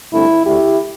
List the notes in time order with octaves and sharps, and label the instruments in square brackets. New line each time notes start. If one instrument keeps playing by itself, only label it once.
[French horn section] G2 D3 A3 C4 E4
D2 D3 A3 E4 G4